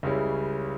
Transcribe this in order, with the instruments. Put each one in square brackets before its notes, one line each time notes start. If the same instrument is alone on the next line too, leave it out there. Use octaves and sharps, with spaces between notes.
[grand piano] C#2 C#3 G3 C#4 E4